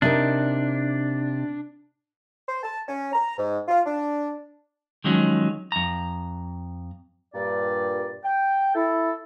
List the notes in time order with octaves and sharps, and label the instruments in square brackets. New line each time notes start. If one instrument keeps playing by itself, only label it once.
[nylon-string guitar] C3 D#4 A#4 [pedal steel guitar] D4
[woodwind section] C5
A5
C#4
A#5
G#2
F4
D4
[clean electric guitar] D#3 F3 F#3 G#3 C#4
F2 A#5
[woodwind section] G2 A#2 D5
G5
E4 A4